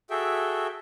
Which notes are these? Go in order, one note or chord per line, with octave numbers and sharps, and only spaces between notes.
F#4 G#4 A4 E5 G5